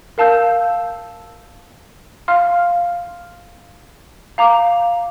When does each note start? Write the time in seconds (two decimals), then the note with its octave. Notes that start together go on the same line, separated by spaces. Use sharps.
0.18 A#4 F5 A5 E6 G6
2.28 F5 C6 F6
4.38 F5 A#5 D6